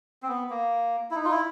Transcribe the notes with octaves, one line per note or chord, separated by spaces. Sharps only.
C4
B3
A#3
E4
D#4
F4
E4